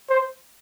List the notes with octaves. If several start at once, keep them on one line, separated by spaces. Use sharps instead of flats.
C5